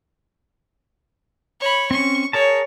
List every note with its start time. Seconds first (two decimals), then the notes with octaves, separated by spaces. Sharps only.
1.60 C#5 B5
1.91 C4 C#4 C#6
2.33 G#4 A#4 C#5 A5